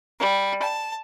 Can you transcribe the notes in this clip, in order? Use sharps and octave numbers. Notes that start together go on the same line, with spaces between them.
G3
A5